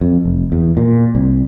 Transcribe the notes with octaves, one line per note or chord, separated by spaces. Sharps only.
F2
F1
E2
A#2
C2